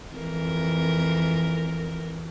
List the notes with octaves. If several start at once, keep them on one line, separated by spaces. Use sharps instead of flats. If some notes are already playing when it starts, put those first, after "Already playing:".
F2 E3 A#4